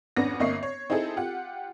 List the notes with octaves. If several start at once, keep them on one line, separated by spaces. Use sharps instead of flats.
G#1 F2 B3 C#4 D4 A#6
G1 A#3 D#5 E5 C#6 C7
C#5
C4 D#4 E4 G#4 A4
F4 G4 F#5